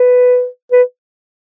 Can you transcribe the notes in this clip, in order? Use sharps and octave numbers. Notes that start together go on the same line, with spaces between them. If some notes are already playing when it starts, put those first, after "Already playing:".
Already playing: B4
B4